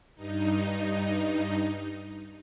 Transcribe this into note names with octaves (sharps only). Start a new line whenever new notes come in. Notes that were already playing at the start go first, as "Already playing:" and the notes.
G2 D#4